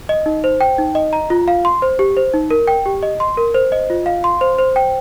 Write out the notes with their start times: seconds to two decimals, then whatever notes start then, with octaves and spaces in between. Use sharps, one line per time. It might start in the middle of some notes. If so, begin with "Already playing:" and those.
0.09 D#5
0.26 D#4
0.44 C5
0.61 G5
0.78 D#4
0.95 D#5
1.13 A#5
1.30 F4
1.48 F5
1.65 C6
1.82 C5
1.99 G4
2.17 C5
2.34 D#4
2.51 A#4
2.68 G5
2.86 G4
3.03 D#5
3.20 C6
3.37 A#4
3.54 C5
3.72 D#5
3.90 F4
4.06 F5
4.24 C6
4.41 C5
4.58 C5
4.76 G5